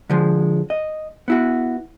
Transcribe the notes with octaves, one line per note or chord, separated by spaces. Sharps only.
D3 F3 G#3
D#5
B3 E4 F#4